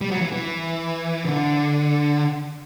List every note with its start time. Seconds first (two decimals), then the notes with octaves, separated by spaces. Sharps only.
0.01 G3
0.11 F#3
0.21 E3
0.32 E3
1.25 D3